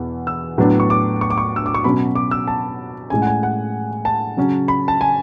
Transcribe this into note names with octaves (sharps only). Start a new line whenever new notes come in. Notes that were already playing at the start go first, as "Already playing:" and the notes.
Already playing: E2 B2 B3
E6
A2 F#3 B3 D4
C#6
D6
C#6
D6
C#6
E6
D6
C#6
B2 F#3 C#4 B5
D6
E6
A5
A2 G#3 C#4 G#5
F#5
G#5
F#5
A5
C#3 F#3 C#4
B5
A5
G#5